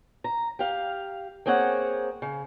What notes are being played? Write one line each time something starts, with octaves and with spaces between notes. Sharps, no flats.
A#5
G4 F5
A#3 C4 G#4 C#5 F#5
C#3